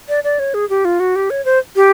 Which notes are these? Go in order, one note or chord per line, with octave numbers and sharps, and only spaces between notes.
D5
D5
C#5
G#4
G4
F4
F#4
G4
C#5
C5
G4